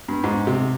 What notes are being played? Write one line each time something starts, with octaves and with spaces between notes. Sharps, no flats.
G2
G#2
C3